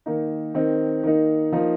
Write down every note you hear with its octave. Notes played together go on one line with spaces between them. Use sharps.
D#3 A#3 D#4
D#3 C4 D#4
D#3 A#3 D#4
F3 A#3 D#4